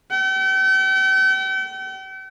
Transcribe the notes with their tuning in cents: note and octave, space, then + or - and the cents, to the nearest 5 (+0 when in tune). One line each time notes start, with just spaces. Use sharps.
G5 -45